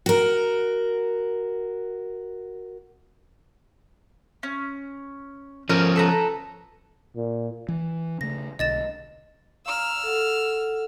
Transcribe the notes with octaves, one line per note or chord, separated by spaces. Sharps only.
F#4 A#4
C#4
F3 C#4 A#4 F6
A4 B4 A#5
A#2
E3
C#3 A3 A#6
B1 D3 D#5 A6 E7
F5 A#5 E6 F6
A4 F#5